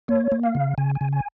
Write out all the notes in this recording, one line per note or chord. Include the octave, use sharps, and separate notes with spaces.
A#3 C#5
A#3
F5
C#3
C#3 G#5
G#5
C#3
G#5